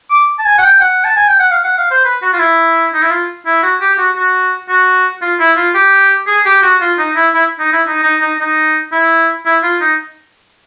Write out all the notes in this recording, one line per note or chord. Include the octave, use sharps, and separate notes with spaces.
D6
A5
G#5
F#5
G5
F#5
A5
G#5
G5
F#5
F5
F#5
F5
C5
B4
F#4
F4
E4
D#4
E4
F4
E4
F#4
G4
F#4
F#4
F#4
F4
E4
F4
G4
G#4
G4
F#4
F4
D#4
E4
E4
D#4
E4
D#4
D#4
D#4
D#4
E4
E4
F4
D#4